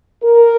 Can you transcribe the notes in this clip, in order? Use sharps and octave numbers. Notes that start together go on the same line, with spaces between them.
A#4